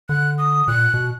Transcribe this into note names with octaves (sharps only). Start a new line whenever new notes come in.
D3 F#6
D#6
A#2 F#6
B2